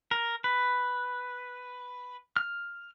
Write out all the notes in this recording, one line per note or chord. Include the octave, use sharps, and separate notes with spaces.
A#4
B4
F6